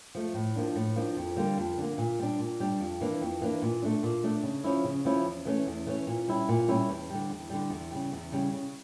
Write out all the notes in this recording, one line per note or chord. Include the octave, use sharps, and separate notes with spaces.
F3 A3
A2
F3 A#3 D4
A2
F3 A#3 D4
F2
D3 G3 A#3
F2
D3 G3 A#3
A#2
G3 D4
A#2
G3 D4
F2
E3 A#3 D4
F2
E3 A#3 D4
A#2
A3 D4
A#2
A3 D4
C#3
F3 C#4 E4
C#3
F3 C#4 E4
E2
E3 A3 C#4
E2
E3 A3 C#4
A#2
G3 C#4 E4
A#2
G3 C#4 E4
E2
D3 G3
E2
D3 G3
E2
C#3 G3
E2
C#3 G3
C#3